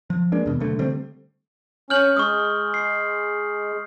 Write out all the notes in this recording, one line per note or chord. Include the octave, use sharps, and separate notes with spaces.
F3
G#3 A#3 D4
D#2 B2
B1 D3 A3
D3 G3 A3 C4
C#4 F6 G6 F#7
G#3 C#6 D#6
C7